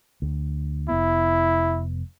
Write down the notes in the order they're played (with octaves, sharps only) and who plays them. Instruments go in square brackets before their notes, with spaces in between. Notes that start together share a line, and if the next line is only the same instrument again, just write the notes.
[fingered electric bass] D2
[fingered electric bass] F1 B3 [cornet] E4